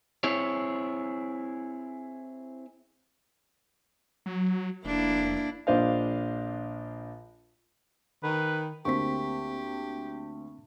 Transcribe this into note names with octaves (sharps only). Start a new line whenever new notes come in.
C4 E4 G#4 C#5
F#3
F1 A#3 D4 E4
A#1 D4 C5 D#5 F5
D#3 B4
D2 A#3 C4 G4 C#6 B6